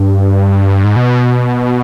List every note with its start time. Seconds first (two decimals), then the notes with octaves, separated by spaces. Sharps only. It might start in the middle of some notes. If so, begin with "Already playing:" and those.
Already playing: G2
0.84 G#2
0.96 B2